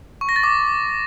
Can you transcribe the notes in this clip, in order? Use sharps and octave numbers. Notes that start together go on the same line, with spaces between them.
C#6
A#6
A6
D6